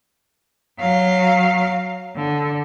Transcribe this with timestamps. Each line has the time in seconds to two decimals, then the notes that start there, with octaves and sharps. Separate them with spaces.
0.80 F#3 F5
2.15 D3